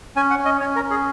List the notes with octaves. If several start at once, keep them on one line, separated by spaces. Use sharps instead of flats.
C#4 G#5
F#5
C#4
D#5
C#4 C#5
A#4
C#4
G#4